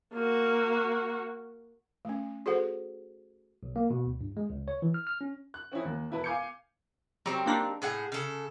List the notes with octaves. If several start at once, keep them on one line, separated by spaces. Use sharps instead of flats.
A#3 F#4
A3 C#4
F#4 G#4 A4 C5 F#5
B1
A#3
B2
D2
G2
G#3
C#2
C#5
E3
F6
F6
C#4
F#6
C4 C#4 D#4 E4
D#2
E1 E4 B4 A5
F5 G#5 D6 G6 G#6 C#7
F#3 G3 C4 A#4
A#3 D4 D#4
A2 G#4 F#5
C#3 A4